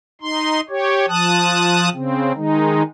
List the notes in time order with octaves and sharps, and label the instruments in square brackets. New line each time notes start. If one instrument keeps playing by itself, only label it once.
[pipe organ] D#4 C6
G4 C#5
F3 A5 D#6 F#6
C#3 C4
D#3 G#3 D#4